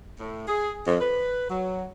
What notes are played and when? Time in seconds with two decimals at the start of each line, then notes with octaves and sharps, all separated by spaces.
0.19 A2
0.47 G#4
0.86 F2
1.01 B4
1.49 F#3